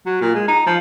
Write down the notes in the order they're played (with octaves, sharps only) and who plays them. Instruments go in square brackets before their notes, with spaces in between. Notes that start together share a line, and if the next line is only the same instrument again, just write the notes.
[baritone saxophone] F#3
A#2
G#3
D#4
F3